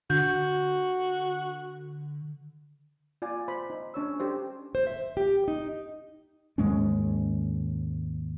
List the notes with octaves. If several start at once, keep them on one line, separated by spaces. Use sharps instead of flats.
D3 F#4 G6
F4 D5 G#5
C5 B5
D#4
C#4 D4 C#5 E6
D4 G4 A4 C5
C5
E5
G4
D#4
D#2 G#2 G#3 C#4